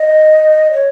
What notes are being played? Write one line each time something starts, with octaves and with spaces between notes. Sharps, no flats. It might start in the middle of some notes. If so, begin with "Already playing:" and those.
Already playing: D#5
C#5